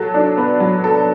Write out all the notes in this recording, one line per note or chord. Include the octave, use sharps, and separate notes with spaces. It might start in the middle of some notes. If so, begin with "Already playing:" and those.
Already playing: F#3 A4
D4
B3
F#3
A4